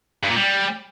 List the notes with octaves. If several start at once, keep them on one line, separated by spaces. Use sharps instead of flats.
G2
A#2
G3